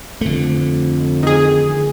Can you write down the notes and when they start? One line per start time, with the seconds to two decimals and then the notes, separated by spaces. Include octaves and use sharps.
0.21 F2 D3 A3
1.23 D#3 G#4